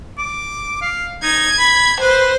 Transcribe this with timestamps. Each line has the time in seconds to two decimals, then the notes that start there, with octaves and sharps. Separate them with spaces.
0.18 D6
0.81 F5
1.23 D#4 G#6
1.58 B5
2.01 B4 C5